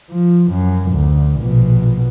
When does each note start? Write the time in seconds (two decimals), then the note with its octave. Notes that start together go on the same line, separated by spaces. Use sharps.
0.11 F3
0.52 F#2
0.92 D2
1.41 A#1 B2